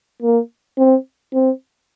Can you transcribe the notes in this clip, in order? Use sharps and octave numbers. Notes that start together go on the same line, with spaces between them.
A#3
C4
C4